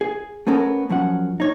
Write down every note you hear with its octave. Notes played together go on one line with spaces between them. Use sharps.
G#4
A3 B3 C#4 A4 A#4
F#2 F3 C#4 F#5
D#4 C#5